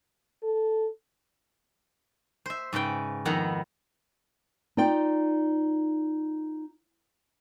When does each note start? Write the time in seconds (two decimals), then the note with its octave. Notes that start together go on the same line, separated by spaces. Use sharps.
0.43 A4
2.46 C5 E5
2.73 G#2 C#3 B4 G5
3.25 F2 D#3 B3 E4 F#5 A#5
4.77 D#4 F4 D5 G5